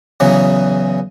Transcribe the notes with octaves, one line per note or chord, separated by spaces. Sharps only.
E2 C#3 E3 F#3